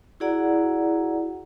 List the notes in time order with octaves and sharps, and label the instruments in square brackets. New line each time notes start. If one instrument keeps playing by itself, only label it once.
[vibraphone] E4 F#4 G#4 D5 F#5 A#5